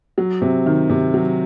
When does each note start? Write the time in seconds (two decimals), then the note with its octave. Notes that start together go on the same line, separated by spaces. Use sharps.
0.18 F#3
0.42 C3
0.66 D#3
0.90 C3
1.14 F#3